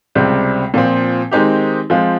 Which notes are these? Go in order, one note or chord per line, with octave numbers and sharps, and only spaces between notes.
C#2 C3 G3 C4
A#2 F3 C4
D#3 G#3 C4 D#4 G4
F3 G#3 C4 F4